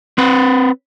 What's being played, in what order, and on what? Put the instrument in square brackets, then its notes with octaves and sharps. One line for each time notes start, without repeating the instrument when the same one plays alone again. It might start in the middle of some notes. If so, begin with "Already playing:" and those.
[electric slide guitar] C4 B4